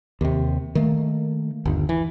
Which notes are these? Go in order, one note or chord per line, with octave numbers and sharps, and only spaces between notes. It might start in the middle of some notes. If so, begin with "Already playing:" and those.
D#2 C3
D#3 A3 A#3
G1 D#2
E3